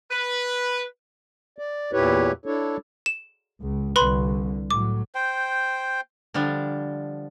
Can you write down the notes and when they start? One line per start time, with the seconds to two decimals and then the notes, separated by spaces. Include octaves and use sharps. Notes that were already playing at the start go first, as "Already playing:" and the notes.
0.11 B4
1.58 D5
1.93 E2 A#2 E4 G4 B4 C#5
2.46 D4 E4 A4 C#5
3.06 E7
3.61 C#2
3.96 C2 D3 B4 B5 C6
4.71 A2 F#3 D6
5.15 C5 G5
6.34 D3 F3 G3 D4